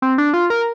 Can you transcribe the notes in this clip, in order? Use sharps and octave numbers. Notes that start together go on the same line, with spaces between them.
C4
D4
F4
A#4